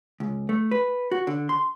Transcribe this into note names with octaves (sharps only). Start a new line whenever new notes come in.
C#2
A3
B4
F#4
D3
C6